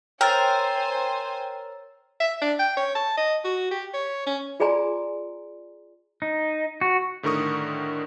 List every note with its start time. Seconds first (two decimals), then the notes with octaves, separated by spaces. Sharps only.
0.21 A#4 C5 C#5 G5 G#5 E6 A6
2.20 E5
2.41 D4
2.59 G5
2.77 C#5
2.95 A5
3.17 D#5
3.44 F#4
3.71 G4
3.94 C#5
4.26 C#4
4.60 F4 G#4 D5 G#5 A#5 C6
6.22 D#4
6.81 F#4
7.23 A2 D3 D#3 A#4 C#6 D#6